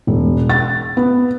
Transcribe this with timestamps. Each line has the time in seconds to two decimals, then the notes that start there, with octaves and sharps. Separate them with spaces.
0.07 E1
0.50 A6
0.97 B3